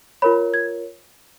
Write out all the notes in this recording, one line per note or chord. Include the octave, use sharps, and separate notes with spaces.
F4 A#4 C#5 B5
G#6